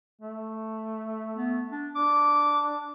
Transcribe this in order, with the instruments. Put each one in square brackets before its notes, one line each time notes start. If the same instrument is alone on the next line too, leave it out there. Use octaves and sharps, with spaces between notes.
[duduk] A3
[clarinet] B3
D4
[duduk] D4 [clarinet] D6